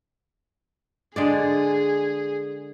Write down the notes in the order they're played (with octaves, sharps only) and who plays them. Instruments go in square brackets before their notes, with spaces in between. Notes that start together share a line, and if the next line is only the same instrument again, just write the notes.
[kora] D3 G#3 D5 [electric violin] G#4